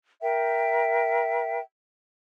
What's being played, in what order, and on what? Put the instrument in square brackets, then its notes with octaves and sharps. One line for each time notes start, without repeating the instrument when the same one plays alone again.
[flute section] A#4 E5 G5